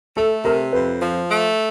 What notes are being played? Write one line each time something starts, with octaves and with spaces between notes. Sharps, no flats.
A3 A4
C3 A#4
F2 B4
F3
A3